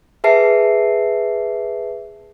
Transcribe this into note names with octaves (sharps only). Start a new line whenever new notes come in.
G#4 B4 E5 A5 C7